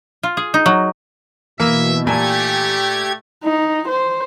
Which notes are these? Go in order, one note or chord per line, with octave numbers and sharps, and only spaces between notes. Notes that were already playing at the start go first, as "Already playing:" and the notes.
F4
G#4
D#4
F#3
B2 E3 A#3 E5
A#2 A3 G4 G#5 A5 G#6
D#4
C5